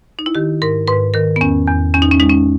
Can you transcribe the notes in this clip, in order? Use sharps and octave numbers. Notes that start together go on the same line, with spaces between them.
D#4
E4
D#3 G4
G#2 A#4
G#2 B4
D#3 A#4
B3
E2 C#4
E2
E2 C#4
D#4
C#4
G#3 D#4
C#4